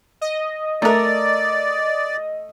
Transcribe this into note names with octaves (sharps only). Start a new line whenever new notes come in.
D#5
A3 D#4 A#4 D5